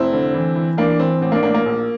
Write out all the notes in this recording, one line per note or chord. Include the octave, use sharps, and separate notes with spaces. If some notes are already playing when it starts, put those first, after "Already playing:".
Already playing: F1 C4 E4
D3
E3
E3
E3 A#3 D4
E3 C4
A1 C4
A#3 D4
A1 A#3 D4
A#3
A#1